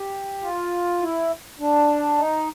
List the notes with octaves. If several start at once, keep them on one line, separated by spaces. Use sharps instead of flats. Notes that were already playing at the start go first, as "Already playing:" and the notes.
Already playing: G4
F4
E4
D4
D#4